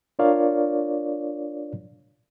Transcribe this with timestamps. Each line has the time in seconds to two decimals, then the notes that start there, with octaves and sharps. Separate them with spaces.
0.19 D4 F4 A#4 C#5 D5 F5